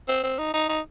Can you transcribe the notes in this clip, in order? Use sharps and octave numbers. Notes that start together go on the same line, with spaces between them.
C4
C4
D#4
D#4
D#4